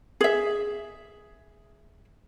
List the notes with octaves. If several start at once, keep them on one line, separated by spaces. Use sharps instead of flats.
G#4 E5